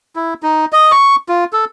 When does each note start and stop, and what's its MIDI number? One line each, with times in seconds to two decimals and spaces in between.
0.16 0.34 64
0.43 0.65 63
0.73 0.92 75
0.92 1.16 85
1.29 1.45 65
1.53 1.65 69